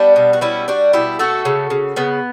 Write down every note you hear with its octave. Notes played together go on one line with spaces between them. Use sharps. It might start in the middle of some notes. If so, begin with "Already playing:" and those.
Already playing: G3 B3 D4
B2
F#4
G3 C#4 E4
G3 D4 F#4
B2 E4 G4
A3 F#4 A4
C#3
C#3
C#3 B3